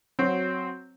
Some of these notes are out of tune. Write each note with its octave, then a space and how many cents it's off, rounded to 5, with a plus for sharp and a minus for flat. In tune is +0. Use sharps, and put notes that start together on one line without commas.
F#3 +0 C4 +0 F#4 -15